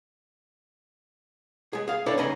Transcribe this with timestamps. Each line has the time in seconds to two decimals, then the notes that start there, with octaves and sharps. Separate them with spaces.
1.73 G#3 G#4
1.88 G#4 F5
2.06 D4 E4 A4 B4 C#5
2.18 C2 C#3 D#4 G#5 A#5 B5